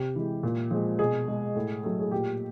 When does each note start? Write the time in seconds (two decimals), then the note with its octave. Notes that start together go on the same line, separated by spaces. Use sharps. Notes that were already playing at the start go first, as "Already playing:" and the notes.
Already playing: C3 G4
0.15 E3 G#3
0.43 A#2
0.71 F3 G#3
0.99 B2 G#4
1.28 G#3
1.55 A2
1.83 F#3 A3
2.00 G#4
2.11 A#2 G4